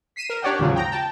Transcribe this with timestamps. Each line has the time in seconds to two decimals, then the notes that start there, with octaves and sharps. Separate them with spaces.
0.16 B6 C7 D#7 E7
0.30 A#4
0.42 D4 G4 C#5 D5 F#5 G5
0.59 D#2 G#2 C#3 F3 F#3
0.76 G5 A#5
0.91 G5 A5